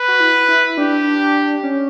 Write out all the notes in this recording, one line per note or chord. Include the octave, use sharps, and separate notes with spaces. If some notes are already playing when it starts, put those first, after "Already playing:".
Already playing: B4
F#4
E4
E4
D4 G4
C#4